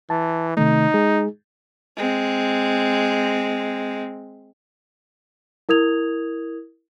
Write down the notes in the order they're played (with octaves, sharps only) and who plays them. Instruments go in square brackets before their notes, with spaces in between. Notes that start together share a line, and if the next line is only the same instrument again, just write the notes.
[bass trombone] E3 [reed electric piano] A5
[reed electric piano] C3 D#3 A3 [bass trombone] D#4
[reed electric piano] G#3 G#4
[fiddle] G#3 C4
[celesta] E4 A#4 D#6 G#6 F7